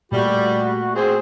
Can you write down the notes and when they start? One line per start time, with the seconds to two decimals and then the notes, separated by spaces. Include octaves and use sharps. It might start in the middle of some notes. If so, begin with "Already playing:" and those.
0.12 A#2 G3 A3 F#4
0.96 C4 G#4